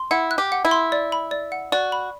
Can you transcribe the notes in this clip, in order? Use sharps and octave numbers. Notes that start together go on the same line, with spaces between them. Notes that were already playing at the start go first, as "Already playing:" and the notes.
Already playing: C6
E4 F#5
F#6
G4
F#5
E4
C6
D5
B5
D5
F#5
F#4 D5
B5